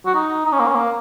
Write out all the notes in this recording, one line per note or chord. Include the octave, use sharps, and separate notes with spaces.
F#4
D#4
D#4
C#4
A#3
C#4
A#3